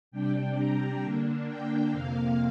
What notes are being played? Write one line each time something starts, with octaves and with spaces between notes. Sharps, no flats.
C3 G3 D4 G5
A#5
D3 A#3 D4
G5
F2 C3 A#3 F5